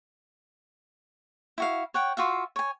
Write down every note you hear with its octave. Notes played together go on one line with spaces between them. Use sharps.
E4 F#4 F5
C#5 F#5 G5
F4 F#4 E5 F5
C#5 G#5